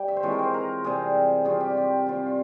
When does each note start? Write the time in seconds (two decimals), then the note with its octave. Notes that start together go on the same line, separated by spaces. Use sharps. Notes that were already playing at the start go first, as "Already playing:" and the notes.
Already playing: G3 G5
0.08 E5
0.17 C5
0.23 E3 G#3 C4 F4 C#5
0.32 A#4
0.39 C5
0.54 A#4
0.84 C3 G3 C4 G#4
1.45 G3 C4 F4 G#4
1.61 G4
1.70 F4
1.77 G4
2.06 G3 C4 F4
2.26 F4